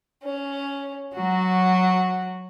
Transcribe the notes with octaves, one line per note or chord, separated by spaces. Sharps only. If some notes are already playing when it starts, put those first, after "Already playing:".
C#4
F#3 F#4